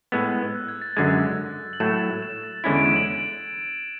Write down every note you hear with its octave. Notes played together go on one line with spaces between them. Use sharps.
A2 G#3 B3 E6
F#6
G#6
A6
F#2 D3 G#3 G#6
F#7
A2 F#3 A3 E7
E7
A6
E2 D3 G#3 C#4 E4 G#6
D7
E7
F#7
D7